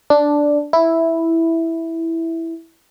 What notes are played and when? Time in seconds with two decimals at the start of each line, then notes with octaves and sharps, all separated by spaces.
0.10 D4
0.73 E4